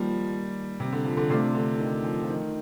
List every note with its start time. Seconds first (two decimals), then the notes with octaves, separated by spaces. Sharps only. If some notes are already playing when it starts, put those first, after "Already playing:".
Already playing: D#3 F3 G3 A#3 D#4
0.80 C3
0.93 D3
1.05 F3
1.17 D3
1.30 C3 A3 D4 F4 A4 C5
1.55 D3
1.79 D#3
2.04 F3
2.24 F3
2.29 D#3